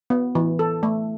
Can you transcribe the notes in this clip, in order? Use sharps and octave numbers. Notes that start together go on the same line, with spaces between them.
B3
E3
A4
A3